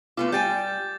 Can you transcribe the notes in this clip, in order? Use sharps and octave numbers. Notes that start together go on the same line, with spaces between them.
A3 B3 F4 D6
G3 G5 G#5 G6 A6